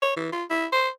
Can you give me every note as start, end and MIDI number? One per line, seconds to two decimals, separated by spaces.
0.02 0.12 73
0.17 0.30 52
0.32 0.44 65
0.50 0.66 64
0.72 0.89 72